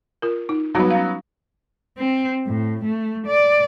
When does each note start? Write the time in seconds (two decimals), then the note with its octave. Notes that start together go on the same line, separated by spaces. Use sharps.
0.22 F4 A#4
0.49 D#4
0.75 F#3 G3 B3 D#4 F#4
0.91 C#4 F5
1.98 C4
2.47 A2
2.84 A3
3.27 D5